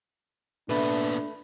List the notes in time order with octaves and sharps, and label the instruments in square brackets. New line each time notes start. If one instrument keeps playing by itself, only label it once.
[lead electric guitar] A#2 B3 [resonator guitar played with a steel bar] A3 B4 [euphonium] D4